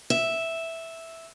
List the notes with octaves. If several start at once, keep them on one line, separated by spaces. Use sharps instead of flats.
E5